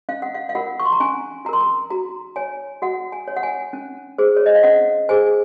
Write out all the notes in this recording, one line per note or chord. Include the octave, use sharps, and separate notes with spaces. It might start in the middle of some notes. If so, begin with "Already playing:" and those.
C#4 F5
F#5
F5
F5
F4 A#4 F#5
C#6
C6
A#5
C#4 G#5
F4 A#4 A#5 C6
A#5
F#4 A#5
C#5 G#5
F#4 F#5
G#5
C#5
F#5
G#5
C#4
G#4 C5
C#5
D#5
F5
C#4 F#5
G#4 C5 G#5